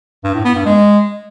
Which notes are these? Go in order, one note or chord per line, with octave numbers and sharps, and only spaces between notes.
G2
A2
B3
G2
G#3